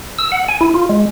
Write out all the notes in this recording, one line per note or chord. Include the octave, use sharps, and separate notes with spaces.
E6
F#5
G#5
E4
F4
G#3